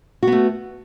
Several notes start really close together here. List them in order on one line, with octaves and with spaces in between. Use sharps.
F#4 B3 A3